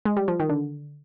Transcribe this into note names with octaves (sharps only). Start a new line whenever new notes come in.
G#3
G3
F3
D#3
D3